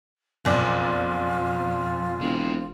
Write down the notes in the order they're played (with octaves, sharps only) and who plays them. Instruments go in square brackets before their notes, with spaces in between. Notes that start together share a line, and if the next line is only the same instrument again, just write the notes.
[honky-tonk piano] F#1 B1 D5 [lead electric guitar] F2 [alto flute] F4
[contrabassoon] E1 [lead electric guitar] G#3 C4